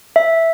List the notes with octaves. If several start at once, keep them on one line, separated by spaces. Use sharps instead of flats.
E5